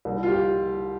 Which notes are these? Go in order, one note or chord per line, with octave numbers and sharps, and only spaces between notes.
C2
F4
G4